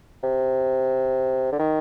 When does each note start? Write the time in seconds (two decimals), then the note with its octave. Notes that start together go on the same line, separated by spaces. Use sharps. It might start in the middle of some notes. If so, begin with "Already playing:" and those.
0.23 C3
1.52 D3
1.59 D#3